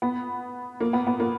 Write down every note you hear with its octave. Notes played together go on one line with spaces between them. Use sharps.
B3
A#3
B3
B3
A#3